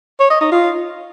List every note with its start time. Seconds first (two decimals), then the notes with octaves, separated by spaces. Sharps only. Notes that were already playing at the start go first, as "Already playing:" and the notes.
0.20 C#5
0.31 D#5
0.41 D#4
0.52 F4